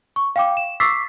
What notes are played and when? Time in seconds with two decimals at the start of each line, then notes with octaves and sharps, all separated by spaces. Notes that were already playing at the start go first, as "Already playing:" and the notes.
0.16 C#6
0.36 F5 G5 D6
0.57 E7
0.80 C#6 D6 E6 A6 B6 C7